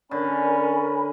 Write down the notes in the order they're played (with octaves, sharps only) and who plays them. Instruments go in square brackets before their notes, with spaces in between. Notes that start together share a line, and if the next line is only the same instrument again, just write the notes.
[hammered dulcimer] D3 [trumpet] C#4 [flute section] A#4 G#5 B5